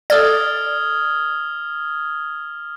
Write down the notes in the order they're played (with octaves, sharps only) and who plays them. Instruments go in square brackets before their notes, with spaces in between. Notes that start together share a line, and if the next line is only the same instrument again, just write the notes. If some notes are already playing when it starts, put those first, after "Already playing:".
[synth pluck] A4 D5 [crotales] D#6 F6 G#6